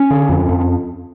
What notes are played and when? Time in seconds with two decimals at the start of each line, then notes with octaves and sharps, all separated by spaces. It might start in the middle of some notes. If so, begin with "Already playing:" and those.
Already playing: C#4
0.10 D3
0.29 F2
0.49 F2